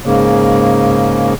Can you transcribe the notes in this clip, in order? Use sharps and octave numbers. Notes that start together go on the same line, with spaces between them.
G#2 C#3 A#3